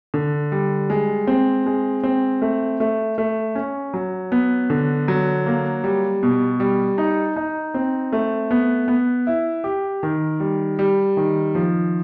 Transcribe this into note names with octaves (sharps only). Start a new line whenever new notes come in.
D3
G3
G#3
C4
G#3
C4
A3
A3
A3
C#4
F#3
B3
D3
F#3
A#3
G3
B2
G3
D#4
D#4
C4
A3
B3
B3
E4
G4
D#3
G3
G3
D#3
F3